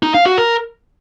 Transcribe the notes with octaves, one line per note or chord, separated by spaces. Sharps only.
D#4
F5
F#4
A#4